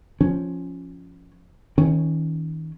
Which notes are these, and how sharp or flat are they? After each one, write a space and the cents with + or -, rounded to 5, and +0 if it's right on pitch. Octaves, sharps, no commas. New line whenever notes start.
F3 +0 C#4 +0
D#3 +35 C#4 +0